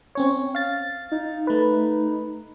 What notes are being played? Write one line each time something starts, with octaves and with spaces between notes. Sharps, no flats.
C4 C#4 C#5
F5 A6
D#4
A3 B4